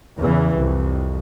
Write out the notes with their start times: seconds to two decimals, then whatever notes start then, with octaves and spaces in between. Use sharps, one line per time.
0.19 E2 C#3 E3
0.57 C2 F2